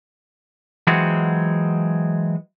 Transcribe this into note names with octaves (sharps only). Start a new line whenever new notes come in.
E3 F#3 G#3 C4 F4 F#4